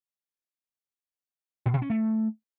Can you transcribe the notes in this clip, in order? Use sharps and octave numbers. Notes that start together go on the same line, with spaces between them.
A#2
B2
C#4
A3